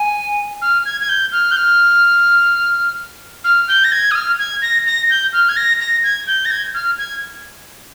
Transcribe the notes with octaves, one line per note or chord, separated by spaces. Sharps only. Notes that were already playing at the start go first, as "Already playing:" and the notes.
Already playing: G#5
F6
G#6
G#6
G6
F6
G6
F6
F6
G6
A#6
G#6
D#6
F6
G#6
A#6
A#6
G6
F6
G#6
A#6
A#6
G#6
G6
A#6
G#6
F6
G#6